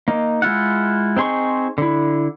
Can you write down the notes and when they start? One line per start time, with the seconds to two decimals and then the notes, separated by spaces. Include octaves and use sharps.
0.08 A#3 D#4
0.42 G#3 E4 F4 F#5
1.17 C4 D#4 G#4 C6 C#6
1.78 D3 E4